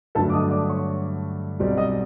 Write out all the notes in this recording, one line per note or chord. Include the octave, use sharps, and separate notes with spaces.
G2 D3 F#3 A3 A4 A5
D6
D#5 D#6
D5 D6
C#5 C#6
B1 B2 G3 C4
D#5 D#6